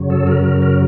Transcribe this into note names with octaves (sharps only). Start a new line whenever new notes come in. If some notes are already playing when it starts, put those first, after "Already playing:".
Already playing: F#2 C#3 F#3
A4
A#4
A#4
A#4